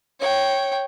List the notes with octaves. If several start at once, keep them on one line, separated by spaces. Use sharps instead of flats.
C#5 G5